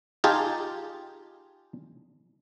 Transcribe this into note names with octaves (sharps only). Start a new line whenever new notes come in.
D#4 F4 G4 G#4 A5